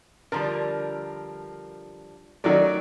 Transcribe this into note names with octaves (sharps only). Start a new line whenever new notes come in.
D3 F3 G3 A#4
D#3 F#3 A3 D5